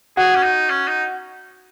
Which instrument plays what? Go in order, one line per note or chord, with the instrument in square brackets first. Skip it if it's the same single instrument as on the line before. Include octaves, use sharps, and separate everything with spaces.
[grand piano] F#4 [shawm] G#4
[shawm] C#4
D#4
C#4
D#4